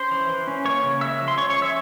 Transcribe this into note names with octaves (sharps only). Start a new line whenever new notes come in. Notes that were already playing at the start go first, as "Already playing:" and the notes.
Already playing: C#4 C5 C6
E3
E3
C#4
A#3 C#5 C#6
C#3
G#3 E5 E6
F3
C6
C#4 C#5 C#6
C#5 C#6
F3
E5 E6